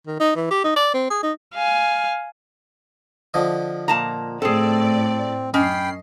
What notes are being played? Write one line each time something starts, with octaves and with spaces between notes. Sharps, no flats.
D#3
D#4
E3
G4
D#4
D5
C4
G#4
D#4
F5 G#5
D3 F3 D#5
A#2 A5 A#5
A2 C4 G#4 A4 D5
F#2 C#4 D#5 G5 B5 C7